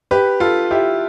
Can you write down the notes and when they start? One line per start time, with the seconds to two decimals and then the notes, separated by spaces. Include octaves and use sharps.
0.11 G4 B4
0.40 F4 A4
0.71 E4 G4